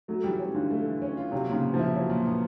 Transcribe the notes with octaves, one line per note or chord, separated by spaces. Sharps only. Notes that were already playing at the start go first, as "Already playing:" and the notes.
F#3 A3
E3 G3
C#4
D3 F4
A3
E3
C#4
F4
C3 F#3
A#2 C#3
B3
F3
E4
F#3
A#2
B3